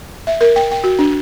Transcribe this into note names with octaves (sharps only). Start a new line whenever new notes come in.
E5
A#4
G5
G5
F#4
D4